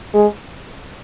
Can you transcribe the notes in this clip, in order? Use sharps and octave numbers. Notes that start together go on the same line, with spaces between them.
G#3